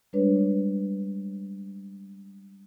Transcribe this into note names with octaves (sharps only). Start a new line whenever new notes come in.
G3 G#3 D4 B4 C#5